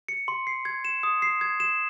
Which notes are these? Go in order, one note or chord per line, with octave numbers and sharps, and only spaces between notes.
C#7
C6
C7
G#6
E7
D#6
C7
G#6
E7